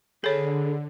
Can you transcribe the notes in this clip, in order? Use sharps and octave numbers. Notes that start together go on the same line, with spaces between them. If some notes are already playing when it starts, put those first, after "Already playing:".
D3 G#4 A4 C#5 B5